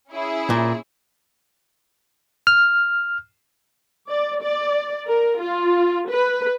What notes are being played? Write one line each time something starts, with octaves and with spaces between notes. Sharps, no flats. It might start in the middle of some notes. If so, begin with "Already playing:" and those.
C#4 E4 G#4
A#2
F6
D5
D5
A#4
F4
B4